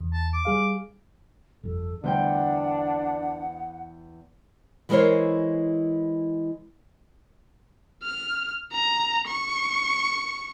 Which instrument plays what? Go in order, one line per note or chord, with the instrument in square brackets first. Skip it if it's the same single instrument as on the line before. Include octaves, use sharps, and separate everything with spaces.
[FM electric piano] E2
[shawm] A5
D6
[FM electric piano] G3 G#4 F5
[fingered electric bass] G1 F2 [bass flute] A4
[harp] E2 C5 G5 [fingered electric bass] D3 G3 A3 [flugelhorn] D4 [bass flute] F#5
[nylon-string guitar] E3 G#3 E4 A#4 C5 C#5
[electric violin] F6
A#5
C#6